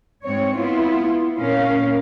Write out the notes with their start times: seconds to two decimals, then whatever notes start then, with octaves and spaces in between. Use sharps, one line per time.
0.24 G#2 C4 C#5
0.58 B3 E4 F4
1.38 A#2 C#4 A#4 F5